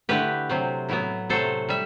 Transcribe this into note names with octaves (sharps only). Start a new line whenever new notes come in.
D3 A3 E4 G4 B4
C3 F#3 C4
A2 F#3 B3 E4
C3 F#3 A3 A4 C5
G3 E5